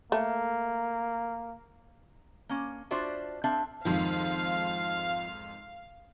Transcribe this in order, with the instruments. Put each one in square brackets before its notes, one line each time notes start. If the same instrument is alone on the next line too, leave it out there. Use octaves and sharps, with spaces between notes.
[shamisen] A3 [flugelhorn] A#3
[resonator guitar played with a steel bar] A#3 C#4
D4 F4 F#4 C5 D5 E5
C4 D4 A4 E5 F5
[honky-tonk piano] F2 G#2 D#3 [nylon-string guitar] F3 [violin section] F5